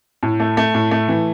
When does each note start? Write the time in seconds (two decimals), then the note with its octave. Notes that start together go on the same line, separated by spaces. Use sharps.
0.23 A2
0.40 A3
0.57 A3
0.74 A2
0.91 A3
1.09 E3